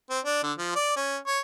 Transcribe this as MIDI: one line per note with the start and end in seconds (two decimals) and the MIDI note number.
0.10 0.19 60
0.25 0.43 62
0.43 0.53 50
0.58 0.73 53
0.75 0.94 74
0.97 1.17 61
1.27 1.40 73